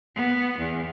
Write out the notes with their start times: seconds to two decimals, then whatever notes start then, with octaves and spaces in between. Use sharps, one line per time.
0.15 B3
0.58 E2